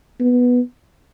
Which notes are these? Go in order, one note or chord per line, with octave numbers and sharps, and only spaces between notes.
B3